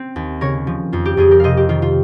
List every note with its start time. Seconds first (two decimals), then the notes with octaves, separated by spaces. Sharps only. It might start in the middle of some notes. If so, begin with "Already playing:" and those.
Already playing: C4
0.16 D#2
0.41 C#3 A#4 C#5
0.67 F3
0.93 F2 F4
1.05 G4
1.17 F2 F4 G#4
1.31 G4 A#4
1.40 C3 C5 D#5 F5
1.57 G4
1.69 D#3 F4
1.82 F4